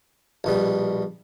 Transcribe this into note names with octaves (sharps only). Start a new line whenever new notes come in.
A#1 B2 G3